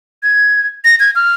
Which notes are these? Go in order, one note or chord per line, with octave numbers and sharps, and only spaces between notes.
G#6
A#6
G#6
F6